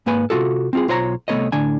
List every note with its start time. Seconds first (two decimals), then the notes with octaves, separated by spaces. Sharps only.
0.06 G#2 A#3 B4 G#5 B5
0.30 C3 D#3 F4 F#4 A4
0.73 C4 F4 G#4
0.88 B1 F4 C5 C#5 F5 A#5
1.28 C2 A3 B3 B4 C#5 D#5
1.52 A2 D3 D4 G#5